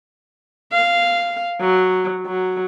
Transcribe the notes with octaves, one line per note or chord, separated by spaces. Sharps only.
F5
F#3
F#3